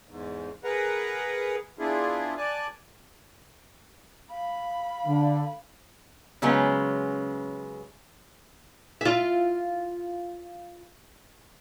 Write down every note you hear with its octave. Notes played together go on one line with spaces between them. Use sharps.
E2 G#2
G#4 A#4 B4 F#5 A#5
B3 D4 E4 F4 G#4
D5 G#5 A5 F#6
F5 B5
D3
C#3 F#3 G#3 B3 C#4
F4 E5